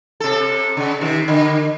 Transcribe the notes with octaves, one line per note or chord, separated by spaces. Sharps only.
C3 A4
C#3
C3 D#3
D3